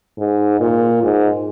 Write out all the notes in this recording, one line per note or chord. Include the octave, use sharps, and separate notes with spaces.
G#2
A#2
G#2